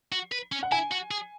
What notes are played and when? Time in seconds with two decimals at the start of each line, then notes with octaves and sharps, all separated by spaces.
0.12 F#4
0.32 B4
0.52 C#4
0.63 F#5
0.72 E4 G#5
0.91 F#4
1.11 G#4